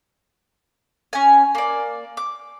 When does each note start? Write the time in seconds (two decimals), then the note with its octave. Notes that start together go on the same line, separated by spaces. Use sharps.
1.13 C#4 G#5
1.55 A#3 D5
2.17 D6